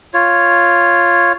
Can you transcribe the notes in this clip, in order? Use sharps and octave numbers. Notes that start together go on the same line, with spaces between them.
F4 C#5